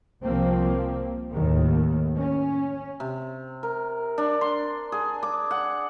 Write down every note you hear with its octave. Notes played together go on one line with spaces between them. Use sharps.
C2 F3 A#3 C4
D#2 A2 D#3
C#4
C3
A#4
D4
C6
G#4
D6
F#5